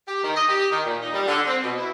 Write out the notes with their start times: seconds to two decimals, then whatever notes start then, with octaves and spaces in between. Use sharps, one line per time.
0.08 G4
0.24 D#3
0.36 D#5
0.49 G4
0.72 D#3
0.86 A#2
1.02 D#4
1.14 G3
1.28 D3
1.47 C4
1.63 B2
1.78 E4